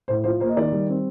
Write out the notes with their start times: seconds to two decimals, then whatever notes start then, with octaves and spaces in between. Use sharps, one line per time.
0.08 A2 C5
0.24 F3 C5
0.40 A#3 C5
0.49 D#5
0.57 D#3 D5
0.72 G3
0.89 C4